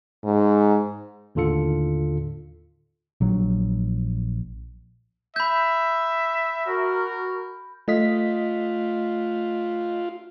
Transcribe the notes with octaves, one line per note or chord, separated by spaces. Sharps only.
G#2
D#2 A2 D3 F4 A4 C#7
A#1 F#3
E5 B5 G6
F#4 A#4
A3 F4 D#5 B6